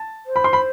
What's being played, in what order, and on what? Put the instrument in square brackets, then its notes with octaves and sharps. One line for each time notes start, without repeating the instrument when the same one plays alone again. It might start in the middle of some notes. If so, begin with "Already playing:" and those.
Already playing: [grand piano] A5
[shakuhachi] C5
[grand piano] B5
C6
B5